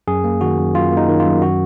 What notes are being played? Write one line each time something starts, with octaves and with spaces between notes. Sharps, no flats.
F#2 G#4
A#3
D#3 F#4
F#2
F#2 F4
A#3
D#4
D#3
F4
F#2
F#4